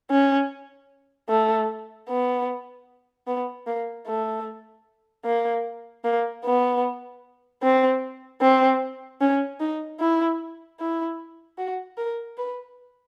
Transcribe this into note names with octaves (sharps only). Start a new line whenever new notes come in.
C#4
A3
B3
B3
A#3
A3
A#3
A#3
B3
C4
C4
C#4
D#4
E4
E4
F#4
A#4
B4